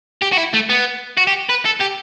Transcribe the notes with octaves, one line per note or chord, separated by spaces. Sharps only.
G4
F#4
E4
A3
B3
F#4
G4
B4
A4
G4